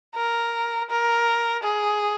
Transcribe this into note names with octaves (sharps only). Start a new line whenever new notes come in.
A#4
A#4
G#4